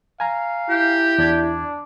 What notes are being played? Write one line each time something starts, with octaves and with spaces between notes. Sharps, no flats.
F5 G#5 A#5
E4 G4
E2 D4 D5 G#6